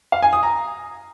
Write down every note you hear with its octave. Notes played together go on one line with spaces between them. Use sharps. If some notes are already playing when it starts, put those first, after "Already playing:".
F5
G#5
D#6
A#5